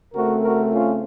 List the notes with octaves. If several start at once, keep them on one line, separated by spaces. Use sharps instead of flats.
C#3 A3 C4 F#4 A#4
F#4 A#4
C#4 F4